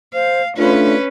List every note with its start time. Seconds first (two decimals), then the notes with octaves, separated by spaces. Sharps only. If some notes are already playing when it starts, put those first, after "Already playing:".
0.14 C5 F5
0.57 A3 C#4 D4 F4 B4